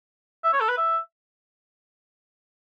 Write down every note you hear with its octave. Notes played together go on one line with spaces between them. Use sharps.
E5
C#5
A4
B4
E5